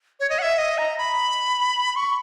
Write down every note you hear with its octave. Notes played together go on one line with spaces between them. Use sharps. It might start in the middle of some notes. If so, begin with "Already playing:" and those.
C#5
D#5
F#5
E5
D#5
A#5
B5
C#6